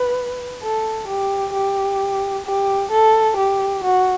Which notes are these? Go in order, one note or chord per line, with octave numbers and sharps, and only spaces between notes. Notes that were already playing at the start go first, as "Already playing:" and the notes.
Already playing: B4
A4
G4
G4
G4
A4
G4
F#4